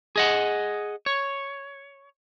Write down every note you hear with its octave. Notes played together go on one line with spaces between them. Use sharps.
G#4 D#5 F#5
C#5